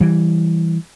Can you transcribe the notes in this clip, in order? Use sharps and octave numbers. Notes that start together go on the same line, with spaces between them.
E3 G3